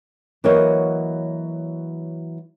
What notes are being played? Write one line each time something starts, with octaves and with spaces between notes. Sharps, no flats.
E3 F#3 A#3 F#4 C#5 D#5